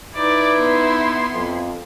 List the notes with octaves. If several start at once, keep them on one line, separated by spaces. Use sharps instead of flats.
D#4 E4 B4 D5
B3 C6
F2